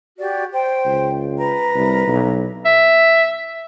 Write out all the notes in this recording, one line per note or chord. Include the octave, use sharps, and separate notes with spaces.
F#4 G4 D5
C5 G5
C#2
B4 A#5
C2
B1
E5